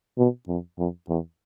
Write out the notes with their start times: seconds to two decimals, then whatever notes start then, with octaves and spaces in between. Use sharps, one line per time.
0.18 B2
0.48 F2
0.78 F2
1.09 E2